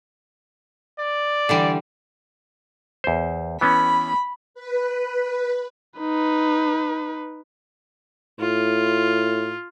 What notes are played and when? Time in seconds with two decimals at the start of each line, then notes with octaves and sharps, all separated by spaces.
0.99 D5
1.49 D3 E3 G3
3.04 E2 C5
3.61 E3 B3 C#4 B5
4.54 B4
6.00 D#4 B4
8.40 A2 F4